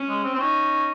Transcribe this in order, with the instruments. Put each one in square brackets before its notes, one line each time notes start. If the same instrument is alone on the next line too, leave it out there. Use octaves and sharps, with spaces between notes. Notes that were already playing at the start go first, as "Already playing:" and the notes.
Already playing: [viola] C#4
[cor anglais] G#3
C4
C4
[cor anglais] C#4 [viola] D#4